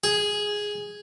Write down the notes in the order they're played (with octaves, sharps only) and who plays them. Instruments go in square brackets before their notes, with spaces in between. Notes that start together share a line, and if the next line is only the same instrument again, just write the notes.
[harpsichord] G#4